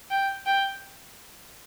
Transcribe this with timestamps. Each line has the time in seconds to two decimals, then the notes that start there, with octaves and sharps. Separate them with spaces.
0.10 G5
0.46 G5